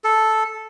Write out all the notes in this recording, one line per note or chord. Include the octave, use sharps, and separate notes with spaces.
A4